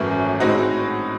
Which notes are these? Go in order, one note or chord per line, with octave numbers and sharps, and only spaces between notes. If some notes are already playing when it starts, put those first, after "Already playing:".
Already playing: G#1 F#2 E3 A3
A2 G#3 C4 D#4 F#4